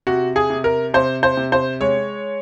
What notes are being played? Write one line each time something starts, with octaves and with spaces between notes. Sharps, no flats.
C3 F#4
G#4
C3
A#4
C3 C5
C5
C3
C5
G#3 C#5